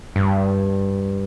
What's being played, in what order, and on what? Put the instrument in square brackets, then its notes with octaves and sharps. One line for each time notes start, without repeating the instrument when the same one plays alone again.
[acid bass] G2